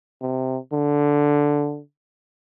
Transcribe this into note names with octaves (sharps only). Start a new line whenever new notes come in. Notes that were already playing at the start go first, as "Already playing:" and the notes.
C3
D3